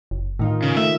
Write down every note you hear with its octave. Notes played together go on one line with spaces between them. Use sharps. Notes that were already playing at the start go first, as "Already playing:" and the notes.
F#1
A2 D#3 D#4 F4
C#3
A3 E5